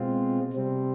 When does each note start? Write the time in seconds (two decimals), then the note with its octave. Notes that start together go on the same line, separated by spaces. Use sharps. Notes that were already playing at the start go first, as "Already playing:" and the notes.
Already playing: B2 G#3 C4 F4
0.53 C3 G3 C4